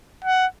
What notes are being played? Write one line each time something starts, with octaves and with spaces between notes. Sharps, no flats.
F#5